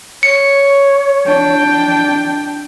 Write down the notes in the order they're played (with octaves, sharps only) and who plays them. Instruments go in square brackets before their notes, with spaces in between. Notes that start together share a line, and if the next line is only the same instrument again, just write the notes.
[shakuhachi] C#5 [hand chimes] C#7
[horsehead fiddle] D4 G5